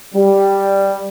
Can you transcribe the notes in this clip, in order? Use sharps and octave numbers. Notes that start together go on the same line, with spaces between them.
G3